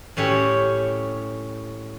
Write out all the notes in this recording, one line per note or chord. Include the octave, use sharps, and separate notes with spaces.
A2 C#4 G4 C#5